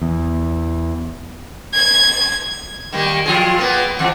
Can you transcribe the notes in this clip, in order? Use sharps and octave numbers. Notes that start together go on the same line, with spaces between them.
E2
G#6
D#3 G3 A#3
F3 F4 G#4
A#3 B3
F2 E3